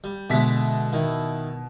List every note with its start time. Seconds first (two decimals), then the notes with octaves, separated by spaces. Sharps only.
0.04 G3
0.30 B2 D3 G#3 D4 E5 B6
0.92 D#3 E4